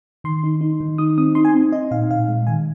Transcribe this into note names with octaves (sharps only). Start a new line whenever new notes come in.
D#3 C6
D#4
D#4
D#3
D#4 D#6
C4 D#6
D#4 C6
G#5
C4
D#4 D#5
A#2 F5
A#2 F5
G#3
D#3 G#5